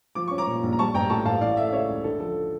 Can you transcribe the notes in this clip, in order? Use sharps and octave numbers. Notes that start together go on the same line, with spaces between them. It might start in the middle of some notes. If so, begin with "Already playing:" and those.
F3 D6
C#4 C#6
A#5 D6
A#2
A#1
A#5
G3 A5 C#6
A1 G5 A#5
A2 A5 C#6
A1 F5 A5
E3 D5 F5
A3 E5
F5
C#3 C#5 E5
C#2
D3 A4
F3 A4